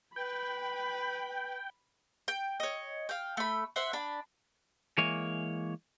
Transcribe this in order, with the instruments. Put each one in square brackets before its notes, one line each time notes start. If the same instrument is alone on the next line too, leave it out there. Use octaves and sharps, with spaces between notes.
[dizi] B4 [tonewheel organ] G5 [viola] B5
[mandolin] G5
C#5 D#5
F5 G5
A3 B5
C5 E5 F#5
D4 B5
[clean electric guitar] E3 G#3 A#3 C#5